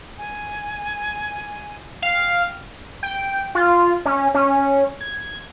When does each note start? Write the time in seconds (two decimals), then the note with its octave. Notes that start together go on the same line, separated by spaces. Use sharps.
0.18 G#5
2.02 F5 G5
3.03 G5
3.55 F4
4.05 C#4
4.34 C#4
5.01 G#6